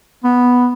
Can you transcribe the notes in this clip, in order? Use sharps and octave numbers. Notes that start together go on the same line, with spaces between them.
B3